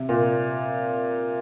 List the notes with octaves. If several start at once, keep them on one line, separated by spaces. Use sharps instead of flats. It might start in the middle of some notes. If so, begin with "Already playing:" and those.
Already playing: C3
A#2